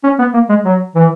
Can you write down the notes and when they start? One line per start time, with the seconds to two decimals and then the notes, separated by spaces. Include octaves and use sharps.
0.03 C#4
0.19 B3
0.33 A#3
0.49 G#3
0.65 F#3
0.95 E3